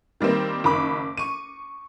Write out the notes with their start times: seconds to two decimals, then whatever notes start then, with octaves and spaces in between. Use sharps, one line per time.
0.20 D#3 G3 A#3 C4
0.64 F#1 D#3 B5 D6
1.17 C#6 D#7